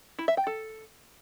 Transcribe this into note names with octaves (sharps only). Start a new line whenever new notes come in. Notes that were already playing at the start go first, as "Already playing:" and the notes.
E4
E5
G5
A4